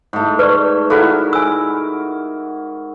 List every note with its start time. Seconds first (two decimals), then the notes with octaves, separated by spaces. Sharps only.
0.13 G#2 A3
0.39 B4 D5 E5 C#6
0.90 E4 F#4 A4 A#4 F5
1.33 G#5 E6